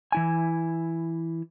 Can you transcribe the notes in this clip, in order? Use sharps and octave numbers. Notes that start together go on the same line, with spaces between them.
E3 E4 G#5